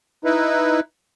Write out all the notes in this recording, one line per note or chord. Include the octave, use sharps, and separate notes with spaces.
D#4 E4 B4